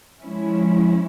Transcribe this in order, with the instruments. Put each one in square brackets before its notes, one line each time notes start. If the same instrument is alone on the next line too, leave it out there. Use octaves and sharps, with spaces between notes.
[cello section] F3 G#3 C#4 E4